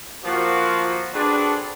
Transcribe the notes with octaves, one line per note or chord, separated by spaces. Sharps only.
F3 A#3 F#4
C4 D4 F#4 G#4 A4 B4